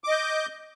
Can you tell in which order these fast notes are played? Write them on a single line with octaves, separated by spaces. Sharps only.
D6 D#5 G6